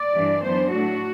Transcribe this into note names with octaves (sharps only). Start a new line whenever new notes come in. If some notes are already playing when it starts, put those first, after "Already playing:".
Already playing: D5
G2 E3 G3 D4
F#2 E3 B3 D4 C5
A2 F#3 A3 D4 F#4